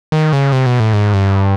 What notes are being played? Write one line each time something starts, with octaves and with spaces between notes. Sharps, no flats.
D#3
C#3
C3
B2
A2
G#2
G2